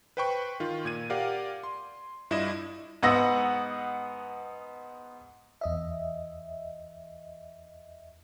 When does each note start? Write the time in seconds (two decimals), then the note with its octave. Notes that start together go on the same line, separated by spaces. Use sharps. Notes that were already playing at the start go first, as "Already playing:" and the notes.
0.17 B4 C5 G5 B5 C#6
0.60 D#3 F4
0.85 A#2 G#6 D#7
1.10 G4 A#4 D5 F5 F#5
1.63 C6
2.31 G2 E4 F4 D5 D#5 E7
3.03 G#2 B3 D#5 F#5 E6 A#6
5.61 E2 D#5 E5